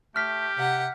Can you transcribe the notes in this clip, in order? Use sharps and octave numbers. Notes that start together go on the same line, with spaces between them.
A3 G4 F6 B6
C3 F#5